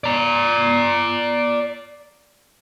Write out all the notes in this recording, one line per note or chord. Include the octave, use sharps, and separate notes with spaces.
D5 A#5